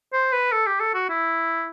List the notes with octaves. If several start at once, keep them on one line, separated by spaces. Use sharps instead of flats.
C5
B4
A4
G4
A4
F#4
E4